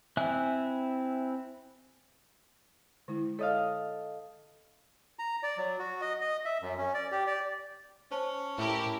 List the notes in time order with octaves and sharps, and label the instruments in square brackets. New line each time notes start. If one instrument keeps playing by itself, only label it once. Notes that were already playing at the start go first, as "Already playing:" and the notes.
[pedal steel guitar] C4 E4 E5 G#5 F#6
[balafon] D3 G#3 E4
[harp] A4 D#5 F5 [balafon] C#5
[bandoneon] A#5
D5
F#3
F#4
D#5
D#5
E5
F#2
C#4
D5
G4
D5
[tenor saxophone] C#4 [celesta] C5 A5
[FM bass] A2 [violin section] E4 G4 A#4 [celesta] E5 A5